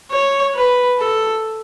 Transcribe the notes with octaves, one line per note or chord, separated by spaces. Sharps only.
C#5
B4
A4